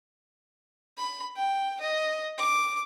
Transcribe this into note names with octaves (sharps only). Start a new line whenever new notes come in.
B5
G5
D#5
D6